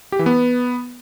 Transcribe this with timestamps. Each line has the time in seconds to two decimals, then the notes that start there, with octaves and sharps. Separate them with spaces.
0.12 G4
0.19 E3
0.26 B3